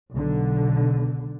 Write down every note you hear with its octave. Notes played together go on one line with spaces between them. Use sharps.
B1 D3